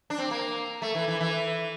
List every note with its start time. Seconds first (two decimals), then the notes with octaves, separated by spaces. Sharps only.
0.10 D4
0.18 C4
0.31 A#3
0.82 A3
0.95 E3
1.08 E3
1.21 E3